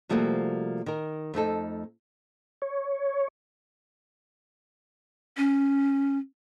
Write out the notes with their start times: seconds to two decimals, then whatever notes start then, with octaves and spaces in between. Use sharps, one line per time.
0.09 C3 F3 G3 A3 A#3 F#4
0.86 D#3 A#4
1.34 F2 A3 D#4 A4
2.62 C#5
5.37 C#4